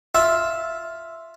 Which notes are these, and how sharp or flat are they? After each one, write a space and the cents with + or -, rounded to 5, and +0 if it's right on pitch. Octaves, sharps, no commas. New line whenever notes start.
F4 +0 E5 +0